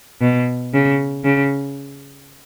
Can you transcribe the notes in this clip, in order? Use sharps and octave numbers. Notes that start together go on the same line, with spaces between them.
B2
C#3
C#3